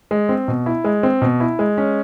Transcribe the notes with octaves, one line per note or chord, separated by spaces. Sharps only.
G#3
C4
B2
E4
G#3
C4
B2
E4
G#3
C#4